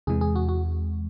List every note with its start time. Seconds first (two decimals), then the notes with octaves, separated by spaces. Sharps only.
0.07 E2 C3 E3 G#3 G#4
0.21 G#4
0.36 F#4
0.49 F#4